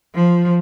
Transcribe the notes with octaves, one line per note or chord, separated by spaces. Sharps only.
F3